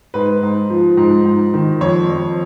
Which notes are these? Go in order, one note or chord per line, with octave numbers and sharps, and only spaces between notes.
G#2 B4
G#2
F3
G#2
G#2
D#3
F2 C#5
F2